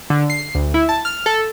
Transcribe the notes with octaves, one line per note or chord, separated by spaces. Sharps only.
D3
C7
D2
E4
A5
F6
A4